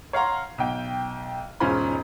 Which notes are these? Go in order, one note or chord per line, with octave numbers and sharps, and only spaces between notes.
C#5 F5 F#5 A#5 C6
B1 G5
E1 G#2 C#4 F4 C5 B5